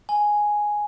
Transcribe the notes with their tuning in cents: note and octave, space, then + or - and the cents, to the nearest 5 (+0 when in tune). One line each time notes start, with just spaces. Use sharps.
G#5 +0